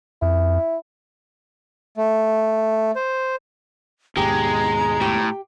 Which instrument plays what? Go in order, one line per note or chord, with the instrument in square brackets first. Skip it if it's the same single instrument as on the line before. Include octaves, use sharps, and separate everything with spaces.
[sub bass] F2 [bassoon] E4
[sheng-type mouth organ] A3
C5
[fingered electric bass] D#2 G#2 B2 [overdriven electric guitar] G#3 [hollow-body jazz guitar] G4 [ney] A#5
[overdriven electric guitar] A2 [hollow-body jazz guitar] G4